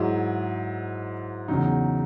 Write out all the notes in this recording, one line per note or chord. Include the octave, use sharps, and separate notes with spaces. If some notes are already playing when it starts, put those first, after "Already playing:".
Already playing: G#2 F#3 E4
E2 C#3 F#3 D#4